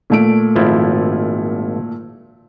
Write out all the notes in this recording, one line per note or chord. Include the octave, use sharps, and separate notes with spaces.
A#2 A3 D7
G#1 F3 E4